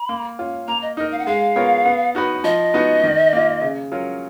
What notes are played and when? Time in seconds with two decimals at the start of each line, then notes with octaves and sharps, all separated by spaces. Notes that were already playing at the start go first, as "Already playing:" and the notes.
Already playing: B5
0.09 A#3
0.39 C#4 F4
0.68 A#3 A#5
0.82 D#5
0.97 D#4 A#4 D#5
1.12 F5
1.19 F#5
1.27 G#3 F5
1.56 B3 F4 A#4 C#5
1.85 B3
2.15 D#4 F#4 B4
2.44 F3 D#5
2.74 B3 D#4 F#4
3.04 D#3
3.33 A#3 F4
3.62 C#3
3.92 F#3 C#4 F4 A#4